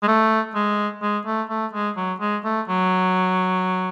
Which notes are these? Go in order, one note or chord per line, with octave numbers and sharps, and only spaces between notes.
G#3
A3
G#3
G#3
A3
A3
G#3
F#3
G#3
A3
F#3